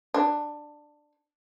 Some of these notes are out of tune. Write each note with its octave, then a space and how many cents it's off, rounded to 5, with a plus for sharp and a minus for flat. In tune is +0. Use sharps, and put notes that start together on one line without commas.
D4 +15